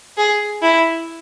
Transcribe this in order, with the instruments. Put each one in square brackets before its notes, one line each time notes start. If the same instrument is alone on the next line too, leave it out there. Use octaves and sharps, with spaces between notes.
[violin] G#4
E4